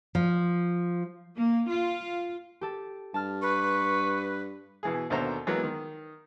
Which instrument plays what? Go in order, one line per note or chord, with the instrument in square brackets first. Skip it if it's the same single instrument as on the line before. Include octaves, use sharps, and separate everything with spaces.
[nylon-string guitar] F3
[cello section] A#3
F4
[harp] G4 A4
[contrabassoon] G2 [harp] A5 F6
[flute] B4 [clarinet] C#6
[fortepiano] B2 E3 G#4
D#2 B2 D3 C5 E5 A#5
E3 F#3 G#3 A#3 B3
D#3